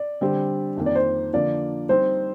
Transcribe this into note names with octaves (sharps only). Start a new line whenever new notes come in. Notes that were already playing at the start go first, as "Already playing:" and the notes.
Already playing: D5
D3 G3 C4 G4 C5
F2 D#3 A#3
D5
C5
D3 F3 A#3 D5
G3 C4 D#4 C5